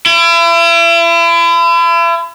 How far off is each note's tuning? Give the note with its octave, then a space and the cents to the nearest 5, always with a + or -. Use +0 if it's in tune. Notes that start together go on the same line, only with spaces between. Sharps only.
E4 +40